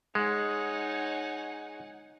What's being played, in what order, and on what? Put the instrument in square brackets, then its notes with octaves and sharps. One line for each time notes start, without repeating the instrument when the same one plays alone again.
[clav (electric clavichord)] G#3 [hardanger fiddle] D#4 C#5 [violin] F#5 G#5